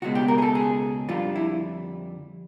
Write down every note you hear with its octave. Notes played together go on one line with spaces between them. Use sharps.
C#2 B2 G#3 F#4
G4
A#4
G#4
A4
G#4
F2 D3 G3 F4
E4